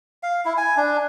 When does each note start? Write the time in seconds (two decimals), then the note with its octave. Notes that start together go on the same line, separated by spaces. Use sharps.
0.23 F5
0.45 E4
0.57 G#5
0.77 D4